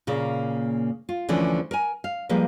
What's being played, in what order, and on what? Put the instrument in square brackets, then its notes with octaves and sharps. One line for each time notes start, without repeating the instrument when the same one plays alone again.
[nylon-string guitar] A#2 C#3 A#3
F4
D2 D3 E3 F3 C#4 C5
A#4 G#5
F5
F3 G3 G#3 A#3 B4